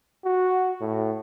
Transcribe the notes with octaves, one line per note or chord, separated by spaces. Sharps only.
F#4
A2